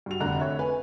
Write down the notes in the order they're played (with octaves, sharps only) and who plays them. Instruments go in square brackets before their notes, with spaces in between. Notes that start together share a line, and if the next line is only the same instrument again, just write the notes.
[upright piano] G2 F#4 F7
F1 D3 A#5 F#6
C#5 E5
B4 G#5